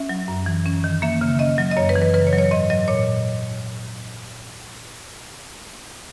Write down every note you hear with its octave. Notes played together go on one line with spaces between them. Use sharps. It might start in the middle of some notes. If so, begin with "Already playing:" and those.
Already playing: C#4 E5
F#3
F#2
E3
C#4
D#3
A#3 E5
C#3
C#4 D#5
F#3
D#5
F#2 C#5
B4
E3
B4
C#3 B4
C#5
F#3
C#5
G#2 D#5
F#3 D#5
A#2 C#5